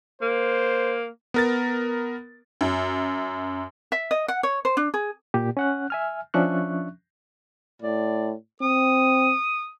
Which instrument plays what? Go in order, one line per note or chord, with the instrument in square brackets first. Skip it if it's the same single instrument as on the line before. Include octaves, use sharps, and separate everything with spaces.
[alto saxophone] A#3 [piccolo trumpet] C5
[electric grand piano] B3 A#4 A6
[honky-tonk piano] F#2
[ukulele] E5
D#5
F#5
C#5
C5
D4
G#4
[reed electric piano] A#2 G4
C#4 F#5 F#6
E5 G#5 F6
F3 C#4 D4 E5 C#6 F#6
[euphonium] A2 [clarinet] D5
[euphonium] C4 [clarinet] D#6